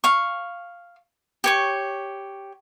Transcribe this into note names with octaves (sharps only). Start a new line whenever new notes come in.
F5 C#6
G4 C#5 C#6